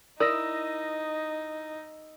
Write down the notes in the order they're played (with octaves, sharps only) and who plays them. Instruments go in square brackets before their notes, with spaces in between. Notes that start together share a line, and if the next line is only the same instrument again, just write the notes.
[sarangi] D#4 [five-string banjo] E4 A#4 D5 [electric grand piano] D#6 E6 A#6